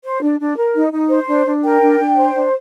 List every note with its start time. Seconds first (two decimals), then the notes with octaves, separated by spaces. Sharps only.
0.04 C5
0.22 D4
0.40 D4
0.58 A#4
0.75 D#4
0.92 D#4
1.10 C5
1.28 D4
1.46 D4
1.64 A#4 G5
1.82 D4
2.00 D4
2.16 C5
2.35 D4